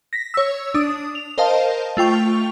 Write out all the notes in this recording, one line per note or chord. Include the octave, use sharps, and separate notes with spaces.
A#6 B6
C#5 E6
D4 D#6
F7
A#4 C5 D#5 F5 A5
A3 F4 G5 C#6 F7